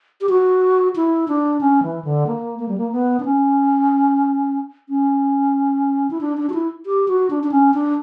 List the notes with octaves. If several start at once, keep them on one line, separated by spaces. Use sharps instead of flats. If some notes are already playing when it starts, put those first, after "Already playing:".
G4
F#4
E4
D4
C#4
E3
D3
A#3
A#3
G3
A#3
B3
D4
C#4
C#4
E4
D4
D4
F#4
E4
G4
F#4
D4
D4
C#4
D4